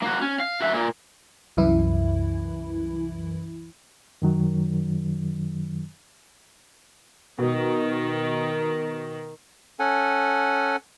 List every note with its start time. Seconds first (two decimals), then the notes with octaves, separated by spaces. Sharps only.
0.03 A#3 F#4
0.22 C#4
0.40 F5
0.61 F#4 E5
0.73 A#2 A#3
1.57 C2 F#2 E3 E4
4.22 F#2 D#3 F#3
7.39 B2 D#3
9.79 C#4 A4 F#5 G#5